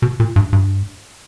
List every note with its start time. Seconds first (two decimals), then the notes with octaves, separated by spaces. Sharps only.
0.02 B2
0.20 A#2
0.36 G2
0.53 G2